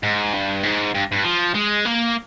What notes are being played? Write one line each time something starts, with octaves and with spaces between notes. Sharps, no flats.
G#2
G2
G#2
G2
G2
F3
G#3
A#3